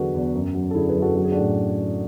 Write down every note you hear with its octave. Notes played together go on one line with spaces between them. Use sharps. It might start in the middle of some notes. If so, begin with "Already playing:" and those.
Already playing: E2 D3 F#3 F#4 G#4 A4 B4
E2
F#2
F#3
A4
D3 E4 G#4
G#4 B4
F#2
F#4 A4
F#3 F#4
G#4
D4 F#4
A2